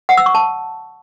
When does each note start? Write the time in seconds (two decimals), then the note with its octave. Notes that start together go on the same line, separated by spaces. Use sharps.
0.09 F#5
0.17 E6
0.26 C#6
0.35 A5